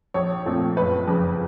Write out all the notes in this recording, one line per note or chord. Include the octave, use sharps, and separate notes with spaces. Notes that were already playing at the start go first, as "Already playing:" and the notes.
A#1 C#5
A#2 F3 A3 C4
F#1 B4
F2 C#3